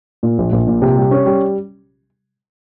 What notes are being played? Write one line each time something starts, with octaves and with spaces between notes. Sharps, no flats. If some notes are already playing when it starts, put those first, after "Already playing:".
A#2
A#1
A#1
A#2
C3
G3
C#4
G3